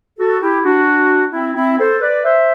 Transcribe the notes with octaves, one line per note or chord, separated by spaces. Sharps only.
F#4 A4
E4 G4
D4 F#4
C4 E4
C4 E4
A4 C5
B4 D5
C5 E5